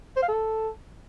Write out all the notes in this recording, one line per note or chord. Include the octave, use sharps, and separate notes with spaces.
C5
F5
A4